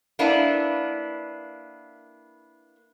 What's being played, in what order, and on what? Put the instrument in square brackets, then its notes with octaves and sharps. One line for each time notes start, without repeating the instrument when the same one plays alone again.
[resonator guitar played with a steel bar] A#3 B3 D4 E4